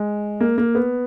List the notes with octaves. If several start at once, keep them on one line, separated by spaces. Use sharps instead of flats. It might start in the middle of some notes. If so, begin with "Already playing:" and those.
Already playing: G#3
A#3
A#3
B3